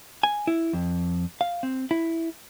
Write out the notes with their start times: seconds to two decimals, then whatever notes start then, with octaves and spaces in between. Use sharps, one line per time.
0.23 G#5
0.47 E4
0.73 F2
1.41 F5
1.63 C4
1.91 E4